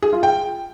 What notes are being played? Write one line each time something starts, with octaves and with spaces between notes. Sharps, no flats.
G#4
F4
G5